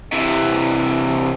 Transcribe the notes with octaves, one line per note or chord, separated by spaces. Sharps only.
C3 E3